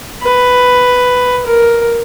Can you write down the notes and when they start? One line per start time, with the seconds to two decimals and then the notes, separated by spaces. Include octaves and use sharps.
0.22 B4
1.46 A#4